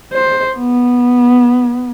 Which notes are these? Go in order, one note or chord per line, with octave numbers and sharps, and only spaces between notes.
C5
B3